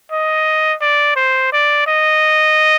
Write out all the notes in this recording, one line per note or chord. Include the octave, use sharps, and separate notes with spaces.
D#5
D5
C5
D5
D#5